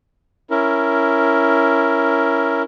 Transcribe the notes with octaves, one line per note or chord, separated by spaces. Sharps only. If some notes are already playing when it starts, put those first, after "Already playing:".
C#4 E4 A#4